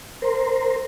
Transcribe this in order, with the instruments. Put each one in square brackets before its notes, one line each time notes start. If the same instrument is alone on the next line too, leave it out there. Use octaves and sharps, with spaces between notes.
[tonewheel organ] A#4 C5